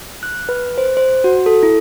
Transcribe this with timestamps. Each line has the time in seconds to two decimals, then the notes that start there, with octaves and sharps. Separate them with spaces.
0.23 F#6
0.49 B4
0.78 C5
0.97 C5
1.24 F#4
1.46 A4
1.63 E4